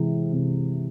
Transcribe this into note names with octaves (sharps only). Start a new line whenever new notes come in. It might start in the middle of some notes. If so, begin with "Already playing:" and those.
Already playing: C3 E3 G#3
C3